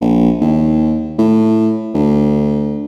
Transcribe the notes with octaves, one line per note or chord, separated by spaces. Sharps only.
A#1
D#2
A2
D2